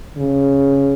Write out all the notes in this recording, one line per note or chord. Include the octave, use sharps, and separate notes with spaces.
C#3